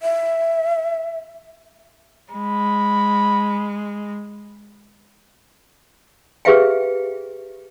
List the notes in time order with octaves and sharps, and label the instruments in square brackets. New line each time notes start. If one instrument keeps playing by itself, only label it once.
[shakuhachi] E5
[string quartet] G#3 [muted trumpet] B5
[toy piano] G4 G#4 B4 E5 F5 G5